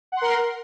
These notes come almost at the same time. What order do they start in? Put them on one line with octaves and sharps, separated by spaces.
F#5 C6 A#4